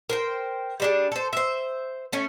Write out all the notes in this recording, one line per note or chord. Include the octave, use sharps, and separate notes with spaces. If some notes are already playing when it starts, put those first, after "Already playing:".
A#4 C5 G5
G3 D4 G#4
A4 C5
C5 E5
A3 C#4